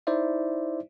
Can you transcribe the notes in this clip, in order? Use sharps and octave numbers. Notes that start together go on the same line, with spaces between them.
D#4 E4 C5 D5 E5